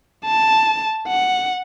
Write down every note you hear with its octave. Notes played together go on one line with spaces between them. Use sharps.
A5
F#5